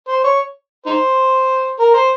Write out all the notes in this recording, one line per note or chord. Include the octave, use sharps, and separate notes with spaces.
C5
C#5
D#4 C5
A#4
C5